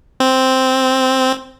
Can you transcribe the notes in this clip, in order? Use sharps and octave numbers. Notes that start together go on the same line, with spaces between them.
C4